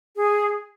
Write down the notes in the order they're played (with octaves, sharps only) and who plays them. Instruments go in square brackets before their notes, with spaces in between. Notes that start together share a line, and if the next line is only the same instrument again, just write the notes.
[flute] G#4